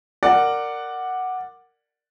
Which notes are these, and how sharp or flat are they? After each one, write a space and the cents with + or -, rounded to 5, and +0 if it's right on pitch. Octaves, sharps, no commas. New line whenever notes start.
A#4 -15 D5 +5 F#5 +0